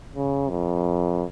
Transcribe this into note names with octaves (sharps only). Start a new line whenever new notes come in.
C#3
F2